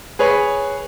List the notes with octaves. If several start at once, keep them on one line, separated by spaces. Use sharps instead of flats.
G#4 B4 C#5